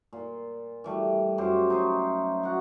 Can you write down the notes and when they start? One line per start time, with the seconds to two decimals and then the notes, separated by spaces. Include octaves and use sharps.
0.13 A#2
0.84 E3 G3 A3
1.38 F#2 G4 C5
1.70 D#4 C5 C#5
2.43 F#4 F#5